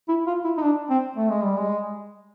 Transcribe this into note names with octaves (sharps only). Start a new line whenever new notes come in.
E4
F4
E4
D#4
D4
C4
A3
G#3
G3
G#3